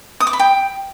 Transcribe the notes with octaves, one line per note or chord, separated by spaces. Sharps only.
D#6
D6
B5
G5